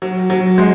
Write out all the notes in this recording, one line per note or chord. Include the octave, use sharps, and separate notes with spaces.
F#3
F#3
G#3